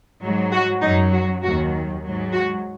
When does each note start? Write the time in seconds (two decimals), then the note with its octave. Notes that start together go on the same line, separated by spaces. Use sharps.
0.21 G#2 F#3
0.52 F#4
0.82 F#2 F#3 D#4
1.12 F#4
1.43 D#2 D#3 F#3 F#4
2.03 G#2 F#3
2.33 F#4